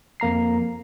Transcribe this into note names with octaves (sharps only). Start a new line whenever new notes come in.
F2 A#3 A#5 C7